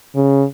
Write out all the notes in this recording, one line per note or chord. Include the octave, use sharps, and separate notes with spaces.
C#3